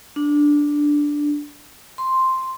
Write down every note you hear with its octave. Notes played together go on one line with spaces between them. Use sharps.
D4
C6